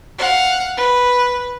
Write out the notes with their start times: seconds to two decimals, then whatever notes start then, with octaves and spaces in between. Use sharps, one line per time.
0.18 F5 F#5
0.77 B4